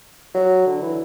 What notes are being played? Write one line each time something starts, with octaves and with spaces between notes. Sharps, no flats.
F#3
D3
E3